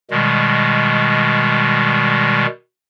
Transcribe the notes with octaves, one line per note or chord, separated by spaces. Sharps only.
B2 D#3 G3 G#3